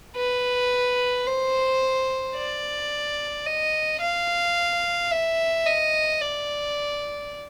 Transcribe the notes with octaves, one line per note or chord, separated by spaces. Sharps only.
B4
C5
D5
D#5
F5
E5
D#5
D5